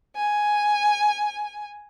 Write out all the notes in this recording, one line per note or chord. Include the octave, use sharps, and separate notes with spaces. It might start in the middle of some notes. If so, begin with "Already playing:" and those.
G#5